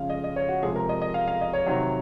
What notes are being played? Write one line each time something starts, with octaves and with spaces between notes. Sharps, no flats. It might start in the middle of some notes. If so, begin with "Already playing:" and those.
Already playing: C#3 F3 G#3 F5
D#5
D#5
C#5
F#4
C3 F3 G#3 G#4
A#4
D#5
D#5
F5
F5
D#5
C#5
C3 D#3 F#3 C#5